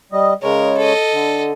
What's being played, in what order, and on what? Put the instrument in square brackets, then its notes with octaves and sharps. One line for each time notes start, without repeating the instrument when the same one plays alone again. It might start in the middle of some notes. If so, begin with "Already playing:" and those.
[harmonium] G3 D#5
[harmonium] C#3 G#3 C#5 [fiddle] A#4
[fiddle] A4 D#5
[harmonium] D3